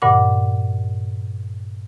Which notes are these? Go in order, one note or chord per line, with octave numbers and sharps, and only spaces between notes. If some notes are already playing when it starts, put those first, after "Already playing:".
G2 A#2 D3 F#5 D6